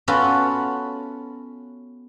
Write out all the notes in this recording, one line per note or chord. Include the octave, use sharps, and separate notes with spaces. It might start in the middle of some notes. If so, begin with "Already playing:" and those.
B3 C#4 F4 F#4 A4 B4